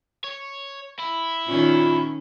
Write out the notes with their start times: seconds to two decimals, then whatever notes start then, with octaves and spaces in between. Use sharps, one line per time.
0.24 C#5
0.99 E4
1.48 A#2 D#3 C#4